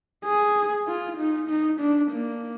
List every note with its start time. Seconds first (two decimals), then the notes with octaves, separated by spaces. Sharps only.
0.25 G#4
0.87 F4
1.18 D#4
1.48 D#4
1.80 D4
2.11 A#3